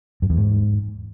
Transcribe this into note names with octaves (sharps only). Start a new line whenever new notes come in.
F#2
E2
G#2